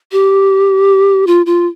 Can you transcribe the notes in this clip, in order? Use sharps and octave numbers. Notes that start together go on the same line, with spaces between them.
G4
F4
F4